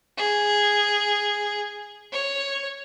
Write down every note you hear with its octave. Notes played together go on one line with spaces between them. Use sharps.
G#4
C#5